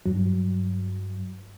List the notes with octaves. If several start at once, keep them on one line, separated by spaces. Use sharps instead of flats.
G2 F#3